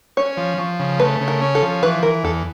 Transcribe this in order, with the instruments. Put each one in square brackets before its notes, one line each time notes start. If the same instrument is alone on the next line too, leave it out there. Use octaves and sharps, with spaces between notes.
[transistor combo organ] C#4 [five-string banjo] C#5
[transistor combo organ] F3
F3
C#3
[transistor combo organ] A3 [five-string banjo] B4
[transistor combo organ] C#3
[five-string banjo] A#4
[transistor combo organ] C#4
[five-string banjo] A4
[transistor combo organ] F3
[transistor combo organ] E3 [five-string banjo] B4
[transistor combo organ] E3 [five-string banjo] A#4
[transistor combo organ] E2 [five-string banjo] A4